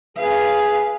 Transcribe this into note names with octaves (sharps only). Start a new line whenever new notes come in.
G#4 B4 F5